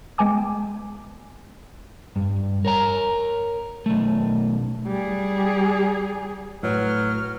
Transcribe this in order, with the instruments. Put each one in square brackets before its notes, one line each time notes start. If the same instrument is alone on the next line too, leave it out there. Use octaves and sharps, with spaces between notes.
[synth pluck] G#3 B3 G5 G#5 D6
[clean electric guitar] G2
A#4 C#5 A#5
B1 A3
[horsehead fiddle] G3 G#4
[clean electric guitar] A2 [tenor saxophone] F#3 [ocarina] B4 [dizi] F6